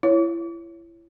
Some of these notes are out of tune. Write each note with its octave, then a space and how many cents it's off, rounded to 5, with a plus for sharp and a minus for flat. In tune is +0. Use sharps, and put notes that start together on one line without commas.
E4 +30 C#5 +0